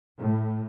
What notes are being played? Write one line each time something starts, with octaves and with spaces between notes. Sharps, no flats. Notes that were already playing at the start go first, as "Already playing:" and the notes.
A2